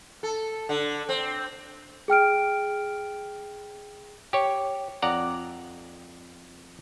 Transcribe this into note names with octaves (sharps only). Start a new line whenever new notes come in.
A4
D3
C4
G#4 G5 F6 D7
G4 C#5
F2 D5 F#5 A#5